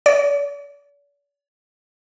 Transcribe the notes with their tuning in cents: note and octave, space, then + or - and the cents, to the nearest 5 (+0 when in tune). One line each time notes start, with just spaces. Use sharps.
D5 -45